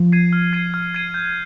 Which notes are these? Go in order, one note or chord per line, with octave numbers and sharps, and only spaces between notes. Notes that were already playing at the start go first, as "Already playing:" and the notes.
Already playing: F3
G#6 C7 D#7
F6
G#6 C7 D#7
F6
G#6 C7 D#7
G6